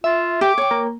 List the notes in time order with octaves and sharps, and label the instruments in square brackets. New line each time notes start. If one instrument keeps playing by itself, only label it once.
[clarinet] F4 [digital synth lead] E5
[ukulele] G4 [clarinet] D6
[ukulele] C#5 G5
[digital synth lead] A#3